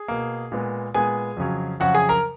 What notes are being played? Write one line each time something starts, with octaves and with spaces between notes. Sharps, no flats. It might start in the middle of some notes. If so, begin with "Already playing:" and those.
Already playing: G#4
B2 A#3
A#2 G#3 B3
A#2 G#3 B3 G#4 G#5
F2 C#3 F#3
F2 C#3 F#3 F#4 F#5
G#4 G#5
A#4 A#5